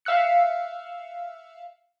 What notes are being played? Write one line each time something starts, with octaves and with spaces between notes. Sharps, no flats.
E5 F5 E6 F#6 C#7